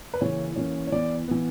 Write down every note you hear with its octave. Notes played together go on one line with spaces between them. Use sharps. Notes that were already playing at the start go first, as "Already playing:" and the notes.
B4
C#3 E3 A#3 C#4 C#5
E3 A#3 C#4
C#5
E3 B3 D5
E3 B3